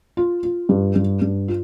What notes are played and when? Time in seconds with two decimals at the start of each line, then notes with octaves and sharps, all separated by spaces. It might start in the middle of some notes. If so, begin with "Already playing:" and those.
0.17 F4
0.43 F4
0.69 G2
0.96 G2
1.22 G2
1.48 F4